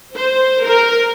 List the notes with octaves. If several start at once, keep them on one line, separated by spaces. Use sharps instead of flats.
C5
A#4